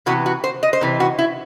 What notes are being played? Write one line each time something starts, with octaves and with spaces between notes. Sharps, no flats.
C3 E3 B3 F#4
F#4
C5
D#5
C5
C3 E3
F#4
E4